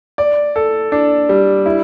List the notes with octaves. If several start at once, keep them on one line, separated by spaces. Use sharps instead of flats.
D5
A4
D4
G3
E4